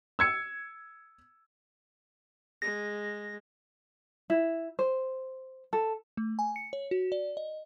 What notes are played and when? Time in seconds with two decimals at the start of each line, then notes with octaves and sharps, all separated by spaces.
0.19 E6 G#6 C#7
2.62 G#3 A#6
4.30 E4
4.79 C5
5.73 A4
6.17 A3
6.39 G#5
6.56 C#7
6.73 C#5
6.91 F#4
7.12 D5
7.37 D#5